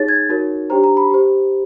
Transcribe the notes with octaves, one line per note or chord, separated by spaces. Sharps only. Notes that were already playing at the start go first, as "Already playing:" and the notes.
Already playing: D#4 G#4 C#5 A6
G#6
D#4 F#4 A#4 C#5
D4 G4 C5 A#5
A#5
B5
G4 C5